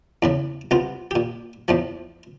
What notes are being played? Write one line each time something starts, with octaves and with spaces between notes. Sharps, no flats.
E2 A2 C#3
C2 B3 F4
A#2 G4
E2 A2 F3